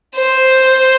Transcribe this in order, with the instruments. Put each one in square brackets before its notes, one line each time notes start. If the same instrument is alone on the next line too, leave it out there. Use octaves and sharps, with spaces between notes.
[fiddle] C5